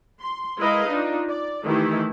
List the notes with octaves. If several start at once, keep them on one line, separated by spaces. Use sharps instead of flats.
C6
G#3 E4 A#4 B4 D#5 F5
D4 D#4 F4
D5
D#3 E3 A3 E4 G4